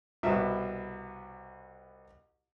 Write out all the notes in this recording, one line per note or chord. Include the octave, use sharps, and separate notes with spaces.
C2 B2 E5